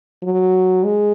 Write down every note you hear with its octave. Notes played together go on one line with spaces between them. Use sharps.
F#3
G#3